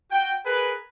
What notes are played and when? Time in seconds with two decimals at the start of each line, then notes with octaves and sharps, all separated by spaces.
0.12 F#4 G5
0.45 G#4 A#4 B4